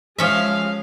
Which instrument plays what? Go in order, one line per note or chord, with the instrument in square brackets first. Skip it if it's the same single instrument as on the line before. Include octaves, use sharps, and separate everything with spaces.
[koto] F3 C#4 E5 [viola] G#3 F5